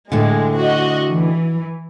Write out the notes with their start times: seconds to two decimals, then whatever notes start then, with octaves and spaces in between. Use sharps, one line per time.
0.12 A2 D3 G#3
0.57 F#4 D#5
1.11 E3